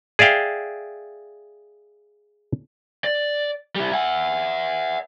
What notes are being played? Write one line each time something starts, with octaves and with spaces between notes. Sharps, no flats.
G#4 D5 E5 F5 G5
D5
G3 E4
E5 F#5